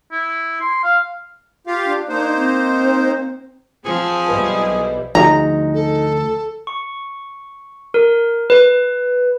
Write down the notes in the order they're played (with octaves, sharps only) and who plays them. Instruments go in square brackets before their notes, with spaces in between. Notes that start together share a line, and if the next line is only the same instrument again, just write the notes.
[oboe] E4
C6
F5
[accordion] F4 G4 F5
[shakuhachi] D4
[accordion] A#3 D#4 C5
[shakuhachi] C4
[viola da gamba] F3 [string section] C4 A5 [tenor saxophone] G#4
[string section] B1 G3 E4 [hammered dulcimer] B4 D#5
[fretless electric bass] D2 F3 [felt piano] D#4 F#4 G#4 [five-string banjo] A#5
[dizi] A4
[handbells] C#6
A#4
B4